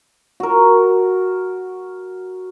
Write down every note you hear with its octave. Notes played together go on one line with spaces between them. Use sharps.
F#4 A#4